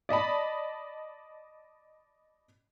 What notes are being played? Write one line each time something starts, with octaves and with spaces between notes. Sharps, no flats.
D5 D#5 A5 B5